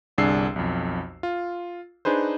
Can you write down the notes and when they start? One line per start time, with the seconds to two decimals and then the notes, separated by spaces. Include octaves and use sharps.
0.18 G1 C2 D4 G#4 E6 C7
0.56 B1 F2
1.23 F4
2.05 D4 D#4 G#4 B4 C5